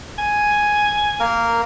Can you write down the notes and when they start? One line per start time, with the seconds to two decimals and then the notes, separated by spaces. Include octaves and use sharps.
0.18 G#5
1.20 A#3 A#4